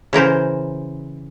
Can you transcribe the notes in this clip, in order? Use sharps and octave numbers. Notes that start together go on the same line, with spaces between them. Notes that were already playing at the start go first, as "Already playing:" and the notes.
C#3 E3 A#4 C5